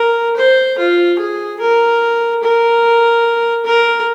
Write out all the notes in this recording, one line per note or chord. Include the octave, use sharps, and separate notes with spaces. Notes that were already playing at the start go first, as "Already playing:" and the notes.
Already playing: A#4
C5
F4
G#4
A#4
A#4
A#4